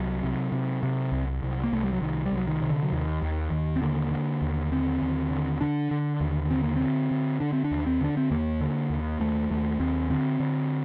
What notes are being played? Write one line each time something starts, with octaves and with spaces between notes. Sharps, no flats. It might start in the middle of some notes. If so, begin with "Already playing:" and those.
Already playing: C2 F#3
C3
C3
C3
C2
C2
A#3
C2 A3
G3
F#3
C2 D#3
G3
C2
F#3
D#3
C3
D3
F#3
D#2 D#3
D#2
D#2
C4
D3 A#3
D3
D#2
D3 C4
D#2
D3
D3 D4
D3
D#2
D3 C4
A#3
D3 C4
D3
D3 D4
C4
D4
D#2
C4
D3 D4
C4
D#2 A#3
D3
D#2
D#2 A3
D#2 A3
D#2 C4
D3 C4
D3